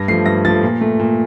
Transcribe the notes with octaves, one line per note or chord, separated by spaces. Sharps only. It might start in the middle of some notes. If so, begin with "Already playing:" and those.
Already playing: G2 A#6
F3 A3 C7
G2 A#6
F3 A3 A6
A#2
A3
A#2